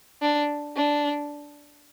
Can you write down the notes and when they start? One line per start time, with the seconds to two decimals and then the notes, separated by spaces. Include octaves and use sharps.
0.22 D4
0.76 D4